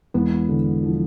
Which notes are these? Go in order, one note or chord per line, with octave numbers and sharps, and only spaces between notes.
E1 B3
D3
F3